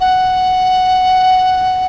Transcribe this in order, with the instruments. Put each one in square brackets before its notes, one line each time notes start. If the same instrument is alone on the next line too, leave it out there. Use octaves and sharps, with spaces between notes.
[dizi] F#5